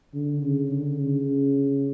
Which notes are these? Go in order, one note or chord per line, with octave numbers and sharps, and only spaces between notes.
D3
C#3
D3
C#3